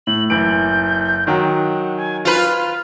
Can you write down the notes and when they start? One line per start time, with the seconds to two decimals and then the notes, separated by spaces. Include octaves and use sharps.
0.07 A2 F#7
0.30 F#1 E3 G6 D7
1.27 D#3 F#3 F#5 G5
1.97 G#5
2.25 F4 B4 F6